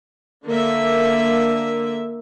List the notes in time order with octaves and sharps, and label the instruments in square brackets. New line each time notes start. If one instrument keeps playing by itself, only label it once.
[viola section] D3 A#3 E5